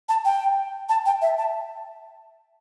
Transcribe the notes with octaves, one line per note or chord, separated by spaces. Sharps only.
A5
G5
A5
G5
E5
A5